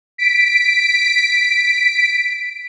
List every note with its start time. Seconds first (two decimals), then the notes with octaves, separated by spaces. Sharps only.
0.18 B6 D7